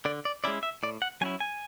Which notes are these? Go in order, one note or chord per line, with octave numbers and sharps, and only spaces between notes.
D3 D5
D5
G#3 C#4 E4 D5
E5
A2 D5
F#5
F#3 C#4 E4 G#5
G#5